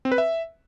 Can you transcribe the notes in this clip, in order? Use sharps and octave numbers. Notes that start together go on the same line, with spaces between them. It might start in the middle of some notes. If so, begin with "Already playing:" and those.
C4
B4
E5